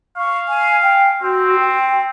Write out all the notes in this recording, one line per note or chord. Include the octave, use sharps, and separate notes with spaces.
F5 C#6
G#5
G5
C4 F#4
G5